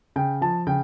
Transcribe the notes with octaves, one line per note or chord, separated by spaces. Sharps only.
C#3 G5
F3 A5
C#3 G5